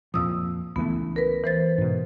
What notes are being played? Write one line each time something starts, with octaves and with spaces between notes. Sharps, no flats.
F2 A#2 F3 D#6 E6
C#2 E3 A3 B3
A#4 B4
E3 C5 A6
G#2 B2